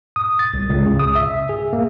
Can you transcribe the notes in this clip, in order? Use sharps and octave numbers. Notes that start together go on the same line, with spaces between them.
D#6
A6
C2
C#2
C#3
D#6
E5
G#4
A#3